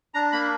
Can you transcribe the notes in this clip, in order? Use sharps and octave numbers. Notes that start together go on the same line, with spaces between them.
D4 A#5
A#3 B5